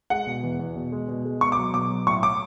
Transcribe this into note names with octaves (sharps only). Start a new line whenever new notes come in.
G#3 F#5
B2
E2
E2
B2
G#3
B2
G#3
B2 C#6
D6
F#3
B2 D6
F#3
A2 C#6
F#3 D6